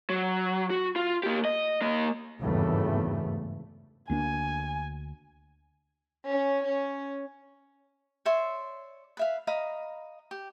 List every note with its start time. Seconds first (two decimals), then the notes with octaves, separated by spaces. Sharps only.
0.10 F#3
0.70 F#4
0.96 F4
1.23 A#3 G4
1.45 D#5
1.81 A#3 D#5
2.41 G#1 E2 G2 C#3 A3
4.10 D2 A#3 D4 G#5
6.29 C#4
6.64 C#4
8.25 C#5 D5 E5 C6
9.17 B4 E5 F5
9.47 D#5 F5 A#5 B5
10.31 G4